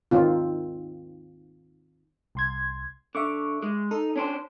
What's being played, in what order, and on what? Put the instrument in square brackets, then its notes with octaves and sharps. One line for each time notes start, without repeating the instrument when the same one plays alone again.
[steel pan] D#3 C4 F4
[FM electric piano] C2 C6 G#6
[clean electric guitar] D3 [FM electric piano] E5 C#6 D6
[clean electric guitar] G#3
[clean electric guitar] D#4 [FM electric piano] A4
[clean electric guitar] C#4 D4 C5